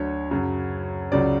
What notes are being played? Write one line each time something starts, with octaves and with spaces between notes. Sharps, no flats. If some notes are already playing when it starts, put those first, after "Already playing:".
Already playing: D2 D3 F#3 C#5
F#2 C#3 F#3
C#2 C#3 F#3 D5